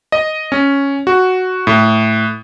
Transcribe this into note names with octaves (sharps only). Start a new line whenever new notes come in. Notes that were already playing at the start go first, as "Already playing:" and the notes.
D#5
C#4
F#4
A2